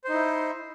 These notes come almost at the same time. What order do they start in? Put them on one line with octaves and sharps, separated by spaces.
C5 D#4 E4